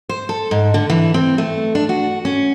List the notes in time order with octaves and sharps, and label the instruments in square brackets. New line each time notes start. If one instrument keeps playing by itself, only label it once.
[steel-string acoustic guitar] C5
A4
G#2
D3
E3
C4
A3
D4
F#4
C#4